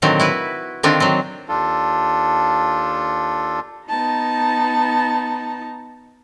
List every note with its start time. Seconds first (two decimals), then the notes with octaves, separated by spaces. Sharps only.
0.02 A#2 D3 D#3 F#3 C4
0.20 E4 F#4 B4
0.83 D3 D#3 C4 D4 F4
1.00 F#3 C4
1.48 D#2 D4 F4 A4
3.88 B3 D#4 A5 A#5